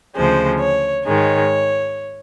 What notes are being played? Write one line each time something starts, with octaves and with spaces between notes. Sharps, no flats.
D2 C#3 F3 G#3 C5
C#5
G#2 D#3 G#3 C#5